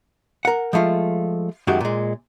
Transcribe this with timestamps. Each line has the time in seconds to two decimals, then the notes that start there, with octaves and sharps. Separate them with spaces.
0.45 A#4 F#5
0.73 F3 G#3 A3 F4
1.67 F#2 D#3 F#3 G#3 F#4 G4
1.81 A#2 G#3